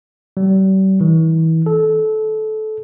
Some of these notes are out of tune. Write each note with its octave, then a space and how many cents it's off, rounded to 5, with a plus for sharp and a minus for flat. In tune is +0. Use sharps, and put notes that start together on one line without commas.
G3 -40
E3 -35
A4 -20